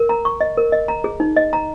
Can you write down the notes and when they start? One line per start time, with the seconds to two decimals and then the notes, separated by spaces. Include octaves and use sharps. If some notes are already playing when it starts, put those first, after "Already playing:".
Already playing: A#4
0.09 A#5
0.25 C#6
0.41 D#5
0.57 A#4
0.72 D#5
0.88 A#5
1.04 G#4
1.20 D#4
1.36 D#5
1.53 A#5